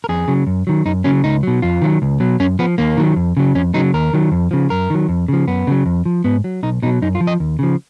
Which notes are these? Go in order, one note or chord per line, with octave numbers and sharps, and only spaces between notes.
A#4
F2 G#4
C#3 F#3
F#2
D#3 F#3
F#2 D#4
C#3 F#3 C#4
C#2 D#4
B2 F#3
F2 F4
D#3 F#3
C#2
B2 F#3
F#2 C#4
F3 B3
D#2 A#3
D#3 F#3
F2
C#3 F#3
F2 C#4
C#3 F#3 D#4
D#2 A#4
D#3 F#3
F2
C#3 F3
F#2 A#4
D#3 F#3
F2
C#3 F3
F#2 B3
C#3 F#3
F2
F3
G#2 B3
F#3
B1 D#4
B2 F#3 D#4
F#2 D#4
F4
F3
D#5
D#2
C#3 F3